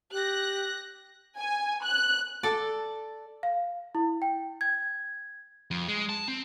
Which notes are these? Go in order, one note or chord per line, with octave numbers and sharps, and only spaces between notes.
G4 F#6 A#6
G#5
F#6
A4 D5
F5
E4
G5
G#6
F2
G#3
A5
C4